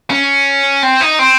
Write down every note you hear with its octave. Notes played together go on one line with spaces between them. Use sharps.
C#4
C4
D#4
C4